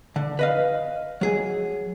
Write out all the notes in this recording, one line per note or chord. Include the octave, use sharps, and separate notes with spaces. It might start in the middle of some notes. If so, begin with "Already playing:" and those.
D3
B4 D#5 F5
F#3 G#4